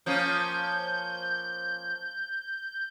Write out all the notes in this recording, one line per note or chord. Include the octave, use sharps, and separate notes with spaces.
F3 A#3 C#4 G6